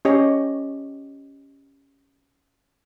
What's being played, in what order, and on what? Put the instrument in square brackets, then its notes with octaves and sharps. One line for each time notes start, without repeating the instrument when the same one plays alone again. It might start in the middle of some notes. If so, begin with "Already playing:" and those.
[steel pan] C#4 G4 C#5 D#5